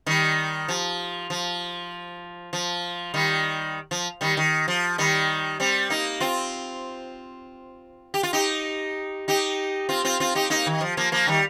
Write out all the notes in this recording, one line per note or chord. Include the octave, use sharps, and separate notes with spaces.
D#3 G3
F3
F3
F3
D#3 G3
F3
D#3 G3
D#3
F3
D#3 G3
G3 C4
A#3 D#4
C4 F4
G4
F4
D#4 G4
D#4 G4
C4 F4
C4 F4
C4 F4
D#4 G4
A#3 D#4
D#3
F3
F3 A#3
F3 A#3
D#3 G3